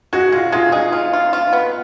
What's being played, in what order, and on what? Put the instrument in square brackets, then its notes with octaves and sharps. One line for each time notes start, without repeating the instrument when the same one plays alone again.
[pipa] G#3 [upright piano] F#4
[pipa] G#3 [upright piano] F4
[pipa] G#3 [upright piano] F4
[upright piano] D#4 [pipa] G#4
[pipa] F4
F4
F4
B3